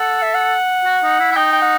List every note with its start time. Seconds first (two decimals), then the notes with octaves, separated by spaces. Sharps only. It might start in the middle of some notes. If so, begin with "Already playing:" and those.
Already playing: A4 F#5
0.22 E5
0.34 F#5
0.85 F#4
1.03 D#4
1.20 E4
1.32 E4
1.36 D#4 G5
1.52 G5
1.62 F#5